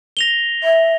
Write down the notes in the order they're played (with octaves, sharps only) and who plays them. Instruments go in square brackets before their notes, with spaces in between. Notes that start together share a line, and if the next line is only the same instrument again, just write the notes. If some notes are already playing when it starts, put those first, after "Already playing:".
[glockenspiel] A#6 F7 G7
[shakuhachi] E5